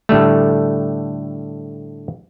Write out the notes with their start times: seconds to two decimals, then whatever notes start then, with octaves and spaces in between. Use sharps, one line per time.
0.09 A2 D3 G3 A3